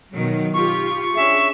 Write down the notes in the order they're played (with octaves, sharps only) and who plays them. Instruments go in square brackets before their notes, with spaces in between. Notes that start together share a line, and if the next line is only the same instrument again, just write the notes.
[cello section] B2 D#3 F#3
[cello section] F4 G4 [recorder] C#6
[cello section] C#4 D4 G#4 [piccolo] E5